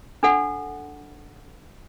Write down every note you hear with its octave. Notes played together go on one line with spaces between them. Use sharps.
D4 A4 F#5